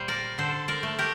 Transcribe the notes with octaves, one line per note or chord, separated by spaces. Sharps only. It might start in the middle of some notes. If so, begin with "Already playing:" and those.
Already playing: A#2 G3 C5
A#4 D5
D3 A4 C5
A#4 D5
A3
G4 A#4